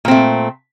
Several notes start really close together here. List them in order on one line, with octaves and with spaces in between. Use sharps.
A#2 C4 A3